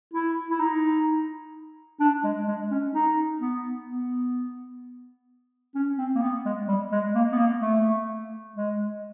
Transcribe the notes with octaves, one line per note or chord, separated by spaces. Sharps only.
E4
E4
D#4
D4
G#3
G#3
C#4
D#4
B3
B3
C#4
C4
A#3
B3
G#3
G3
G#3
A#3
B3
A#3
A3
G#3